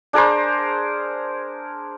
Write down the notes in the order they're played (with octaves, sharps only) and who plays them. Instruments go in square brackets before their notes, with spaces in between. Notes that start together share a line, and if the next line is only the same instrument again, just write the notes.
[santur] D4 G#4 A#4 C5